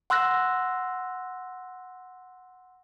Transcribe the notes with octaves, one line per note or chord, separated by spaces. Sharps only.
F#5 C6 E6 F#6 A#6